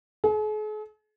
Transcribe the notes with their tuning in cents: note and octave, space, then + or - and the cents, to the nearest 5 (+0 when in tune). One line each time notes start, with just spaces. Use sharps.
G#4 +45